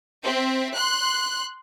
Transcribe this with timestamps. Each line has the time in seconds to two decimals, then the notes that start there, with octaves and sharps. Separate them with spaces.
0.24 C4 E5
0.74 C6 F#6